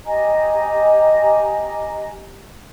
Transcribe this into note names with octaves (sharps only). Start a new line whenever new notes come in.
G4 D#5 G#5 A#5